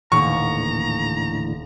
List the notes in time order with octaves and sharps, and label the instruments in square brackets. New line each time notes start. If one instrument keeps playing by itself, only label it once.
[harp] D#1 [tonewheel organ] A2 D3 E3 [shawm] A#5 [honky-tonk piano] C#6